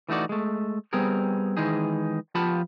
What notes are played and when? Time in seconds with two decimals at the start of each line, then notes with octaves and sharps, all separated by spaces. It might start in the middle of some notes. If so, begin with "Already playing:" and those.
0.09 E3 A3 D#4 F#4 D5
0.29 G#3 A3
0.93 G3 B3 C4 G#4 A#4
1.57 D#3 E3 G#3 D#4 G#4
2.35 F3 B3 F4 G4 A5 B5